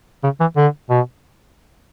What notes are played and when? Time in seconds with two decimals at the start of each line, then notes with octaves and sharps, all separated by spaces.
0.24 C#3
0.40 E3
0.56 D3
0.90 B2